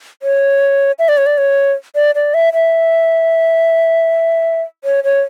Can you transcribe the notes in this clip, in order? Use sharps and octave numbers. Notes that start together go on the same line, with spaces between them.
C#5
E5
D5
C#5
D5
C#5
D5
D5
E5
E5
C#5
C#5